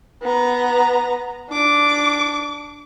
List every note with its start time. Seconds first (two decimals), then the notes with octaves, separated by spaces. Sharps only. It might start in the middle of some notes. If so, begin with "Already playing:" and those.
0.22 B3 A#5
1.50 D4 D6